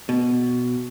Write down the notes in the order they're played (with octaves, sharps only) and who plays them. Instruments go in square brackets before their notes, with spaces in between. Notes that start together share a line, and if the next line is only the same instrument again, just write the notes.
[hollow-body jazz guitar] B2